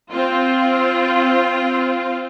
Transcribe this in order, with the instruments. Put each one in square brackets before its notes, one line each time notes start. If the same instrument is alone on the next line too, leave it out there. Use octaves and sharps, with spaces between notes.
[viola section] C4 F4